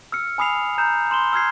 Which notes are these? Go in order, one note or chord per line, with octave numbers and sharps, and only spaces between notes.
E6 F6 C#7
G#5 B5 D#6 E6 C7 F7
A#5 D#6 G6 E7
C6 E7 G7
E6 F6 G#6 C7